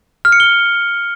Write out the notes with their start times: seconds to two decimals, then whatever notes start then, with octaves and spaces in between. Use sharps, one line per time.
0.25 F6
0.32 C#7
0.40 G7